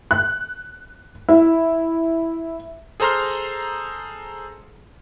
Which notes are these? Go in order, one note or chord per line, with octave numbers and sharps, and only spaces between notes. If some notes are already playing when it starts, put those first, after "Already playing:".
F#6
E4
G#4 A4 C5 A#5 C6 F6